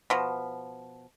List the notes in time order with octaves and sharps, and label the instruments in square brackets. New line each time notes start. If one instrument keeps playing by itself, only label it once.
[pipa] B2 F3